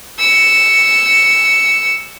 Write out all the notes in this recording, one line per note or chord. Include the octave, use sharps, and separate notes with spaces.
E6 C#7